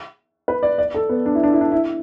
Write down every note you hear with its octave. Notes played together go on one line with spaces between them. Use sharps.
B4
D5
D5
A4
B3
D4
E4
D4
E4
D4
E4